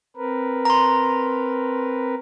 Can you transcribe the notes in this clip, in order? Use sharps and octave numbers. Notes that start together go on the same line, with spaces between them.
C4 A#4 B4
A#5 C6